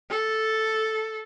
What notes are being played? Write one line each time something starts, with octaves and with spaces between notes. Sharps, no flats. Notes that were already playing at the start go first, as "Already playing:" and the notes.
A4